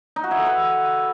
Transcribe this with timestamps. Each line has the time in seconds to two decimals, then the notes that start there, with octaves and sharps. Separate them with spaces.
0.16 D#4
0.24 F#4
0.31 E4
0.39 A4
0.46 B4